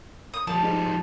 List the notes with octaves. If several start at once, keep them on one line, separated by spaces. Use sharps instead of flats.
D#6
F3 G3 A5
G#2